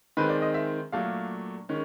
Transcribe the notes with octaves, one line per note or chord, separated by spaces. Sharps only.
D#3 G#3 C4 B4
D5
D#5
E5
A#2 F#3 A3 D4 F5
D#3 G#3 C#4